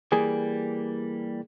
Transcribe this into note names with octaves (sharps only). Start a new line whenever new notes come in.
E3 G3 A#3 G#4